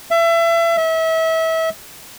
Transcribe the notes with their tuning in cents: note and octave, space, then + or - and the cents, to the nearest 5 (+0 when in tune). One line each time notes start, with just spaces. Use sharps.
E5 +30
E5 -30